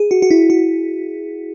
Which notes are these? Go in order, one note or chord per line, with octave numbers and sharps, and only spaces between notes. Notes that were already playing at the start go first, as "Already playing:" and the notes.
Already playing: G#4
F#4
F#4
E4
F#4